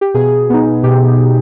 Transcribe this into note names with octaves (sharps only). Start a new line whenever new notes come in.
G4
B2 G#4
B3 D#4
B2 G4